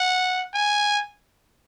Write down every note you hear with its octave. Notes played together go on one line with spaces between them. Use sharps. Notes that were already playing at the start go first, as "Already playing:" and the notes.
Already playing: F#5
G#5